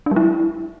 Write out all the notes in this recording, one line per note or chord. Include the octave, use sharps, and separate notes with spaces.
D4
G3
E4